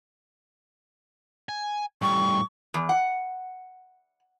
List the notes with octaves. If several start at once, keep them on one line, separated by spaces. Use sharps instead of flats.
G#5
A2 G3 C#6
E2
F#5